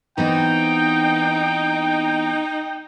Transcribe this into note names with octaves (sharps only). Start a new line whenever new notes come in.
E3 B3 C4 D#4 G5